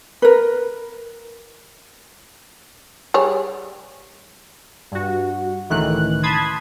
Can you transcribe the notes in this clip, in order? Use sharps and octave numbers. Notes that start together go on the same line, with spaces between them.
A#4 B4
G3 G#4 C#5
G2 F#4
C#2 A2 D#3 E3 F#6
A5 B5 C6 D#6 G#6